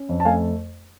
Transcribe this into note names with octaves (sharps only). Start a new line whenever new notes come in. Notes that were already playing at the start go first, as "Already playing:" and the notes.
Already playing: C#4
F2
A5
A3 F5 G#5